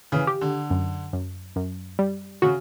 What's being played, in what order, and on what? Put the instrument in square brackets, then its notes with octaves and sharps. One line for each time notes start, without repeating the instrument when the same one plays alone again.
[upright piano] C#3 E3
[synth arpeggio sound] G4
[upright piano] D3
[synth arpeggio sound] F#2
F#2
F#2
G3
[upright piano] C#3 [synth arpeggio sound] F#4